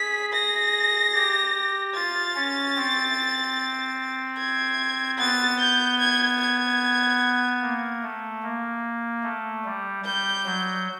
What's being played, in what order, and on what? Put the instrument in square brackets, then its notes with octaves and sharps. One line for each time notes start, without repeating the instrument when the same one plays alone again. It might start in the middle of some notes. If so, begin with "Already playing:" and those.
Already playing: [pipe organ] G#4 [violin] B6
[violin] A#6
[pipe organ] G4
G4
[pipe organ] F4 [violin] A6
[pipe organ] C#4
C4
[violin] G#6
[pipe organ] B3 [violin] A6
[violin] G6
G#6
G#6
[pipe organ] A#3
A3
A#3
A3
G3
[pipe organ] G3 [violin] G6
[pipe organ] F#3